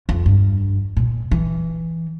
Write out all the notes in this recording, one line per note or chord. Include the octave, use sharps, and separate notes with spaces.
F2
G2
A#2
E3